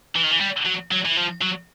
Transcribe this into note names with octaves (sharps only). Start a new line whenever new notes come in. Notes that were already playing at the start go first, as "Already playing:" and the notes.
E3
D#3
E3
G3
F#3
F#3
E3
F3
F#3